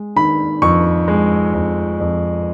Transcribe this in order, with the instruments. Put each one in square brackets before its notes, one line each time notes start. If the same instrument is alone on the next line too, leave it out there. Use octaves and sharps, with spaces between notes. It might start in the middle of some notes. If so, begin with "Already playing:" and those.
Already playing: [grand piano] G#3
D#3 B5
F2 C#6
G#3
F2
F2